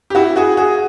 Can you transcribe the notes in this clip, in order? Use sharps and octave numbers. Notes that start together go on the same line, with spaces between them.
G4
E4 F#4
F#4 G#4
F#4 G#4